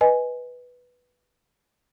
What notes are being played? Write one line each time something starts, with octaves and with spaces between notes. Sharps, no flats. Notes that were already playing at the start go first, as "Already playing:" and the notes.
B4 D#5 G#5